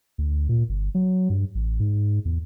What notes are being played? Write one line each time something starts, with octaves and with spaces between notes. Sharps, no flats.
D2
A#2
G1
F#3
G2
A1
G#2
E2